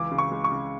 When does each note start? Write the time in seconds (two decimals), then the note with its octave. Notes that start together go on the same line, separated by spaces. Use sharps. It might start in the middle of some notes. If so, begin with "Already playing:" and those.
Already playing: C#2 E3 D6
0.11 C#3
0.18 C#6
0.31 G#3
0.44 C#6
0.52 C#3